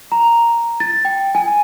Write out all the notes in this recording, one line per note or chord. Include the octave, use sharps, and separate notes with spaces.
A#5
A6
G5
G#5